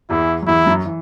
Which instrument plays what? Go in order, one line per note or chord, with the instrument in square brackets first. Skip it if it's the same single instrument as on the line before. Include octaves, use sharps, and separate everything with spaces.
[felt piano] E2 E3 [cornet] E4
[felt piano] F#3
[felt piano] E2 E3 [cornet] E4
[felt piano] F#2 F#3
E3